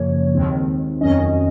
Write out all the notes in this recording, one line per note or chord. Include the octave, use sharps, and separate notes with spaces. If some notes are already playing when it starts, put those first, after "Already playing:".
Already playing: F#2 C#3 F3 A#3 C#5
D#2 D#3 G#3 C4
F2 D#3 F#3 C#4 D#5